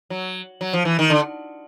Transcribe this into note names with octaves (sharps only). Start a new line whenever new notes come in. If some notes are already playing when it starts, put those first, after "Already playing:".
F#3
F#3
F3
E3
D#3
D3